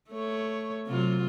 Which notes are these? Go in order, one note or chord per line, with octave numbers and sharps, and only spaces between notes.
A3 C#5
C3 F#3 F4